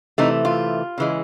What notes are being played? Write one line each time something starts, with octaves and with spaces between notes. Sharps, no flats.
C3 E3 A3 D#4
F4
C#3 E3 G#3